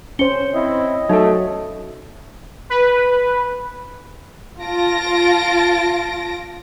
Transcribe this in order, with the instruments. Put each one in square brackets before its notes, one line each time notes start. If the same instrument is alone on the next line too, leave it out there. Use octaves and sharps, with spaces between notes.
[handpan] C#4 C5 [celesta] C#7 G7
[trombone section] C4 E4 [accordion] D#5
[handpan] F#3 [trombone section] A3 [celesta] D#4 A4
[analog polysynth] B4
[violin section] F4 A5 A#6 D7